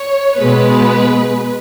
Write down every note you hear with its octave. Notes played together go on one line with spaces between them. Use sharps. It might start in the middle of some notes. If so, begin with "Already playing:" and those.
Already playing: C#5
B2 G#3 B3 B4